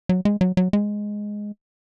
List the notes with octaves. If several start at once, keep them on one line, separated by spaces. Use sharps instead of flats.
F#3
G#3
F#3
F#3
G#3